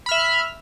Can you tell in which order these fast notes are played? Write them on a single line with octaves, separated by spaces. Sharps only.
B5 F6 E5